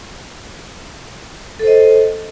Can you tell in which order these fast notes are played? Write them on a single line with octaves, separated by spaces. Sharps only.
A4 C5 D#5